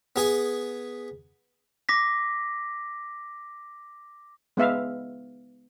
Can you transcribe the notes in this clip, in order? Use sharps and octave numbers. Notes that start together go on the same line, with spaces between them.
B3 G#4 G#5
D6 A#6 B6
G#3 B3 E5 F5